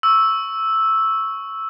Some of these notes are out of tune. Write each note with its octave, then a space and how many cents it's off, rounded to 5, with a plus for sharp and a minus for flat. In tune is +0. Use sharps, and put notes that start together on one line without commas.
C#6 +0 E6 -5